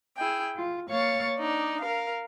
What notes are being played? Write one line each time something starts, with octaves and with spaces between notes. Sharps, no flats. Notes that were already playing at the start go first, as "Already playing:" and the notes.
E4 G#4 G5
F4
A#3 C#5 F5 C#6 A6
D4 D#4 D5
A#4 F5